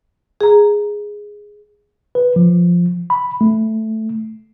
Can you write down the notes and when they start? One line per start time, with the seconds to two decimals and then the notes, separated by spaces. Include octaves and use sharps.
0.41 G#4 A#5
2.15 B4
2.36 F3
3.10 B5
3.41 A3